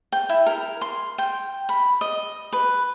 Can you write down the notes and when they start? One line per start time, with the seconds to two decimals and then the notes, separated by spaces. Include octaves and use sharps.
0.12 G5
0.29 E4
0.46 A#4
0.81 C6
1.18 G5
1.69 B5
2.01 D#5
2.53 B4